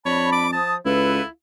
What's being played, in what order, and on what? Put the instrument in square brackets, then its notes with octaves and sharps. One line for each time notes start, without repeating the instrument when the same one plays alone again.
[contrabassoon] F2 [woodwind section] D4 A5 B5 [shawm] C#5
[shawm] D6
[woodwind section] F3 D#6 [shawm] A5
[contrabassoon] C#2 [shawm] E4 [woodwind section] F4 A4 B4